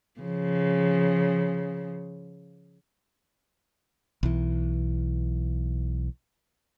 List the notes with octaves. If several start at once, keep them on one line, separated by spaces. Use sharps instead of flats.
C#3 F3
B1 E3